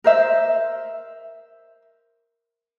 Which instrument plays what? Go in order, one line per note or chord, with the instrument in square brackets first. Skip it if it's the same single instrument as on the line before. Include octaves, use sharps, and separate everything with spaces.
[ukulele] A#4 C5 E5